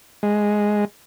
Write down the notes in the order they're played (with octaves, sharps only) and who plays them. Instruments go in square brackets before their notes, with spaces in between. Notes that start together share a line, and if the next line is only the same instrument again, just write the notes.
[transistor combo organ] G#3